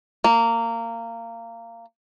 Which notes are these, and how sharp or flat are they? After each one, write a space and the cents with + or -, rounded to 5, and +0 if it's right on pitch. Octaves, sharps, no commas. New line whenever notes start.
A#3 -20